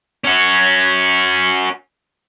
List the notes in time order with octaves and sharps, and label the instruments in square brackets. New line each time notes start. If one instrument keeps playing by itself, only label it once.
[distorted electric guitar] C#4 F#4